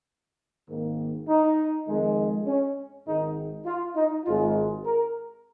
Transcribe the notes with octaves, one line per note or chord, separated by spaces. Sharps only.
G#1 G#2 D#3 A#3
D#4
F2 D#3 G#3
C#4
G#1 G#2 D#3 G#3 D#4
F4
D#4
G#1 G#2 G#3 F4
A#4